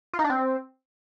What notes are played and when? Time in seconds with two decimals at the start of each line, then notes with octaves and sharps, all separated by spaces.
0.13 F4
0.19 D#4
0.24 D4
0.30 C4